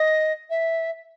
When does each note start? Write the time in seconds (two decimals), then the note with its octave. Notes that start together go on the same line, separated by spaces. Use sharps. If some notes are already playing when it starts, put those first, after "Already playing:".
Already playing: D#5
0.50 E5